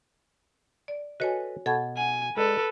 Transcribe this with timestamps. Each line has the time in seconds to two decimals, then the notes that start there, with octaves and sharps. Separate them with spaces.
0.88 D5
1.20 F#4 A4 B4 C#5 D#5 G#5
1.66 B2 A4 G#6
1.97 F#5 G#5
2.37 G#3 G#4 A4 B4 D5